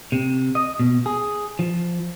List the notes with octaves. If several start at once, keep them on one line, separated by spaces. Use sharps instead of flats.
C3
D#5
B2
G#4
F3